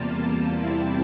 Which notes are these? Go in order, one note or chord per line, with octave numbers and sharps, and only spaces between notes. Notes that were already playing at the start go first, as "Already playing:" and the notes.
Already playing: E2 C3 G3 A#3 F4 A5
E2 C3 G3 C4 E4 A5